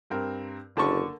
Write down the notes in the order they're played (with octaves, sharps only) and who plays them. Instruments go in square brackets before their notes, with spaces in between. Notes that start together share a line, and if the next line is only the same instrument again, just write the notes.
[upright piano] G2 C4 A#4
[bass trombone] F#1 [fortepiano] D3 A5 C#6 [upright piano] A#3 A4